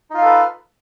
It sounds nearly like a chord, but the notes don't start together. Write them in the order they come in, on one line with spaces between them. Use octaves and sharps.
D#4 F4 F5 A4 B4